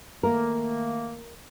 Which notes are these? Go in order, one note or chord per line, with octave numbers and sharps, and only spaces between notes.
D#3 A3 A#3 A#4